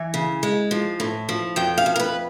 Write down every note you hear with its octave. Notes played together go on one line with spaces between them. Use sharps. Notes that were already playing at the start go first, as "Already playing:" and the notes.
Already playing: E3 G#5
C#3
G#3
F3
A2
F3
F2 G5
F5
F2
A#4
B4